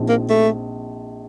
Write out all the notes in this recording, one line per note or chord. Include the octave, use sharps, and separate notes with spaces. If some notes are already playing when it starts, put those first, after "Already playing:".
Already playing: A#1 A#2 F3 C4 D#4
A#3
A3